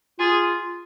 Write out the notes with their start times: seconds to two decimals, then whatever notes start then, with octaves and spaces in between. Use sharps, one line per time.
0.19 F4 G#4